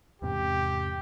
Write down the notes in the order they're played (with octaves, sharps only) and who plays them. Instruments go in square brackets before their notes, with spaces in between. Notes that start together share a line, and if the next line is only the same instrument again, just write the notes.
[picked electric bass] E2 G#2 C3 [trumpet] G4